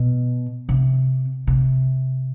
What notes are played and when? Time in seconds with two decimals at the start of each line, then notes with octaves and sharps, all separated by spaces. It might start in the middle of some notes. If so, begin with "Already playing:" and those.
Already playing: B2
0.69 C3
1.47 C3